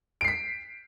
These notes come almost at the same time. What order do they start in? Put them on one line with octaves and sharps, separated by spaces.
D7 C7 B6